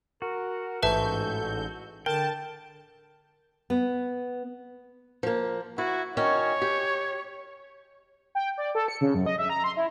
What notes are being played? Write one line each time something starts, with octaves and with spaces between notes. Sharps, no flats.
F#4 A#4
A1 G#2 A4 B4 E5 A5 G6
D3 A#4 G5 A5
B3
F3 A#3
E4 F#4
D#3 C#4 F#4 C#5
G4
G5
D5
A4
C#7
C#3
F#2
D#5
E5
A#5
C6
E4